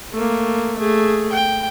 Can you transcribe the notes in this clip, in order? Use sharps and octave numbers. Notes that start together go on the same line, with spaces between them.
A3 A#3
A3 G#4
G5